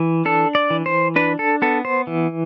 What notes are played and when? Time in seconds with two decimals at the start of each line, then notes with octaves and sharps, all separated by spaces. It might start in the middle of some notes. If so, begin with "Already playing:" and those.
Already playing: E3
0.25 D4 A4
0.55 D5
0.70 E3
0.86 C5
1.16 D4 B4
1.39 A4
1.62 B3 A4
1.85 C5
2.07 E3